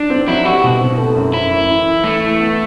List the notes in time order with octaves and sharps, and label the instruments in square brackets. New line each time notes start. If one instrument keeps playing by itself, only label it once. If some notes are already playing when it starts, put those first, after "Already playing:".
Already playing: [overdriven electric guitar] D4
[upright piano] C4
[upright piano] F#3 [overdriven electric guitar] E4
[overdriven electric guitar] F#4 [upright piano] G4
[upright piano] B2
C4
A3
F#2
[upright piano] F#2 [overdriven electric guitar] E4
[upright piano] F#2
E3
E3
[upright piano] E3 [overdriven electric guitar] A3
[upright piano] E3
B3